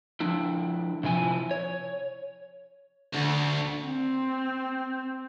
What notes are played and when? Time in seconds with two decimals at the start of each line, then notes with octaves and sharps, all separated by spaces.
0.20 F3 D4 E4
1.04 C3 F3 E4 G#5
1.51 C#5
3.14 D2 D3 C#6
3.85 C4